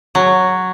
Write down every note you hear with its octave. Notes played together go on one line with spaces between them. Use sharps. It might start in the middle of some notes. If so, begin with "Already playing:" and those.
F#3